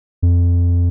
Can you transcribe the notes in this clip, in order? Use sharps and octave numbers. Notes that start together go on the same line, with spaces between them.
F2